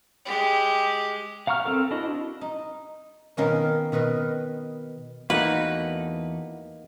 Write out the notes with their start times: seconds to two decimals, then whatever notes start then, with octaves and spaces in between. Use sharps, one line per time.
0.25 G#3 G4
1.47 F5 F#5 A#5 C#6 F6
1.65 C4 A4 A#4
1.91 D4 E4 F#4 D#5
2.41 D#4
3.37 B2 D#3 A#3 C#4
3.92 B2 D#3 B4 D#5
5.30 E2 A3 A#3 D#4 F#4 B4